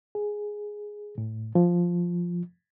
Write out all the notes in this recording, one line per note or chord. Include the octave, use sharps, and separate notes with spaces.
G#4
A2
F3